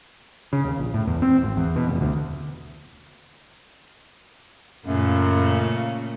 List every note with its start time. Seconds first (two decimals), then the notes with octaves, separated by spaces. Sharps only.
0.53 C#3
0.65 D#2
0.78 A#1
0.94 A2
1.07 E2
1.22 C4
1.43 G#1
1.57 E2
1.76 B2
1.87 F1
2.01 D2
4.86 F#2 A#2 C#3 A3